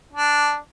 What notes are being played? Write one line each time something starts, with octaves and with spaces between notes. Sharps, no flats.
D4